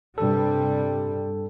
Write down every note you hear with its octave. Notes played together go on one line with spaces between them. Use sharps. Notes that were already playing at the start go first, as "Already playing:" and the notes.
G2 C3 G3 A4